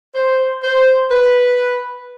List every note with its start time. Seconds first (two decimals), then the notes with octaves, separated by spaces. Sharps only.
0.15 C5
0.64 C5
1.11 B4